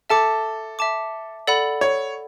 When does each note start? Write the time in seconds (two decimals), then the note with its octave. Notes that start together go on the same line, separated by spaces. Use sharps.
0.10 A4 E5 A5 D6
0.79 E5 A5 D6
1.47 A4 D5 F#5 B5
1.81 C#5